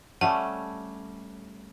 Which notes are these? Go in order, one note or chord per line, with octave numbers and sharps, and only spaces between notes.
G3 A3 C#4 F#5 A5